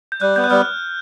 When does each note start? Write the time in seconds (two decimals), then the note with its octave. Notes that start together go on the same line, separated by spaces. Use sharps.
0.12 G6
0.21 G3 F#6
0.36 B3 G6
0.44 F#6
0.51 G3 F6